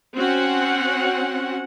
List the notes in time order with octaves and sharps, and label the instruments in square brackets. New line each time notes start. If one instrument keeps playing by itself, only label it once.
[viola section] C4 C#4 F#4 F#5